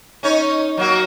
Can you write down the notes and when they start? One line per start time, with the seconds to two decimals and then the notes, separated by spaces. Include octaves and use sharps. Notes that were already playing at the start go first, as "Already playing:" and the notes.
0.23 C#4 D#4 C#5
0.77 F#3 A#3 F#4